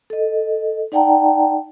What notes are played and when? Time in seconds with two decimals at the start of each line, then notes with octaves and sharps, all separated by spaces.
0.10 A4 D#5
0.92 D#4 D5 F#5 G5 A5 A#5